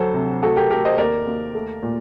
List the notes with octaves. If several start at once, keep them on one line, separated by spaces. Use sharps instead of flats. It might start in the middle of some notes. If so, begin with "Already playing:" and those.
Already playing: D2 F#3 A4 C5
C3
A3 F#4 A4
G4 A#4
A3 G4 A#4
C5 D#5
D#2 A#4 D5
D#2
A3
A#2